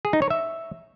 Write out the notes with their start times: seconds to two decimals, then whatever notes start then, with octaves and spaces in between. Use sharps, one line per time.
0.05 G#4
0.13 D#4
0.22 C#5
0.30 E5